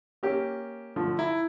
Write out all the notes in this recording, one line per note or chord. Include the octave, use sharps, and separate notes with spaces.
A#3 C#4 G4
D3 F3 A3
E4 A#5